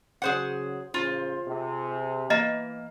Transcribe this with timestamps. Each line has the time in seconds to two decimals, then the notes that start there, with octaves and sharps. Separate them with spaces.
0.22 C#3 F#3 G#4 C5 F#5
0.94 A1 C#3 F4 C5
1.47 C3 G#4
2.30 E3 A#3 D#5